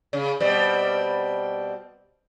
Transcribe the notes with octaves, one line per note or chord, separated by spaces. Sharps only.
C#3
B2 G3 C4